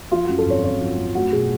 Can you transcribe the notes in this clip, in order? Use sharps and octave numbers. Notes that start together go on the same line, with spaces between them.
F3 F4
F#2 F#4
A4
G#1 C#5
G#1 C#5
F3
F#2
A3 F#4
B2 G#4